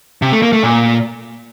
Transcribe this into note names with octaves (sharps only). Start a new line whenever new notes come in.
C3
A3
A#3
A3
A#2